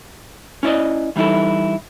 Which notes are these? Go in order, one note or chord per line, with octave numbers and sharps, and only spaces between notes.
C#4 E4 D5 D#5
E3 G3 D#4 E4 A4